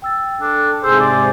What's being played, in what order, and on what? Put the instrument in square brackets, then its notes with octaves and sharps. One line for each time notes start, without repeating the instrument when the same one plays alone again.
[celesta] G5 E6 A6
[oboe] D4 [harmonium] A4
[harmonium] G#2 C3 G#4 [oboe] C5 [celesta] E6 G6
[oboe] D5 [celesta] D6